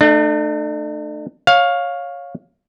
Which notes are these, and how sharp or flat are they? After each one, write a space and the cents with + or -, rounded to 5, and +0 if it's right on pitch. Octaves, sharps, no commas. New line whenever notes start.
A3 +0 D4 +45
C#5 +0 F5 +15